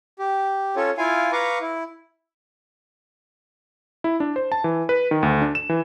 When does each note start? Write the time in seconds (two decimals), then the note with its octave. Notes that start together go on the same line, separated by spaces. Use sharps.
0.19 G4
0.76 C#4 F4 A4 C#5
0.98 E4 F4 F5 G#5
1.32 B4 F5 A#5 C#6 D6
1.61 E4
4.04 E4
4.20 D4
4.36 C5
4.52 A5
4.64 E3
4.89 B4
5.11 D#3
5.23 D2
5.42 D4
5.55 E7
5.69 E3